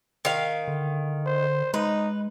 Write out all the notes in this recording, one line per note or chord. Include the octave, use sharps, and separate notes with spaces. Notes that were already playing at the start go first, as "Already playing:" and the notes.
D#3 F5
D3
C5
G#3 D#4 B4